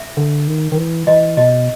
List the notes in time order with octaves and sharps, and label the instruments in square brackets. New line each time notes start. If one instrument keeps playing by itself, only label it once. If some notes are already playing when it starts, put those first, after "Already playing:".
Already playing: [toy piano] E5
[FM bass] D3
D#3
D#3
E3
[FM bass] E3 [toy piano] D#5
[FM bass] B2 [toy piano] D#5